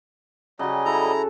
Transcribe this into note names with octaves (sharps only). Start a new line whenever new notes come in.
C#3 F#3 G3 F#4 D#5
E4 A4 A#5